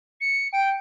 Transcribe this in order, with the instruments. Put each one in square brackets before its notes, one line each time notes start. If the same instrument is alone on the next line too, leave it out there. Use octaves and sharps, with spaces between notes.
[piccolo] C#7
[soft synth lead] G5 [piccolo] D7